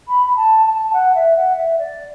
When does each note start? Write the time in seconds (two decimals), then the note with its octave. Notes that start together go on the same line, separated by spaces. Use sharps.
0.08 B5
0.26 B5
0.36 A5
0.66 A5
0.93 F#5
1.15 E5
1.37 F#5
1.57 E5
1.79 D5